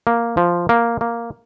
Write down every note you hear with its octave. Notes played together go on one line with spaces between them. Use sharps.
A#3
F3
A#3
A#3